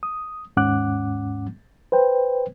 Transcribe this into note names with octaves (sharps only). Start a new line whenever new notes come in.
D#6
D#2 G#2 C#4 F#5 D6 F#6
B4 C5 G5